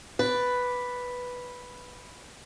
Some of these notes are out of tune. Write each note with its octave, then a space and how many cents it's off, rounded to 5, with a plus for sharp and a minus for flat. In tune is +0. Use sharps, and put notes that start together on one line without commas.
B4 +0 D5 +0